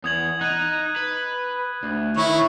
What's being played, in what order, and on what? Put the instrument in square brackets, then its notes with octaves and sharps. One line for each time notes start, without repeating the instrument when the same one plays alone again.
[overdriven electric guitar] E2 [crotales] D#6 G#6 F#7
[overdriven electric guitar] D#4 [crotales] F#6 G#6 D#7
[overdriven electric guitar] B4
D2
[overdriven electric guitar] D#3 [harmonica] E4 C#5